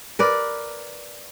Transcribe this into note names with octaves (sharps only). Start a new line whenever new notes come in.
A#4 B4 D5